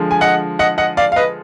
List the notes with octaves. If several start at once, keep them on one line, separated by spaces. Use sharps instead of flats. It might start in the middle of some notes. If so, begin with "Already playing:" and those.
Already playing: D3 F3 G#3
G#5
D#5 F#5
D#5 F#5
D#5 F#5
D5 F5
F5
B4 D#5